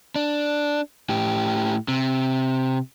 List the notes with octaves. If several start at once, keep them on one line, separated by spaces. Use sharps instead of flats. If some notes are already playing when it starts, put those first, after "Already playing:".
D4
A2 G4
C3